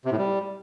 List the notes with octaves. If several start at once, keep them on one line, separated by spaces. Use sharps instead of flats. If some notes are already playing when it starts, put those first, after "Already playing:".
C3
A2
G3